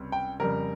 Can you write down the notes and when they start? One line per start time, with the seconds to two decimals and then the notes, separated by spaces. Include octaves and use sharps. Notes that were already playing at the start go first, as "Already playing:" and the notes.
Already playing: C#2 C3 G3
0.12 G5
0.40 F2 C#3 G3 A#4